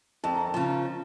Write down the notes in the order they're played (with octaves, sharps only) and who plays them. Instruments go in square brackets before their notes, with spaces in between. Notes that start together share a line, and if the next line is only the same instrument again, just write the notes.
[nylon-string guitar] F2 [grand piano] A5
[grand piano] A#5
A5
[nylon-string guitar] C#3 F3